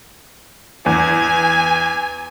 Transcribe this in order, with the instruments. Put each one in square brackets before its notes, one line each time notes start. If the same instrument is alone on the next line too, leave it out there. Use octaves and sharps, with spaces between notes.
[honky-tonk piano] E2 [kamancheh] G#5